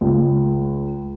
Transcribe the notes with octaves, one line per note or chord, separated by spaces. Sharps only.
C#2